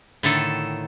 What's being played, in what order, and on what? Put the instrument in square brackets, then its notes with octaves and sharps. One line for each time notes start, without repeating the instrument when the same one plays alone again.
[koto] A2 D3 D#3 A4